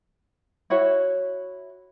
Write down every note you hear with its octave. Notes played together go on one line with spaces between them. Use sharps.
E4 F#4 C#5 E5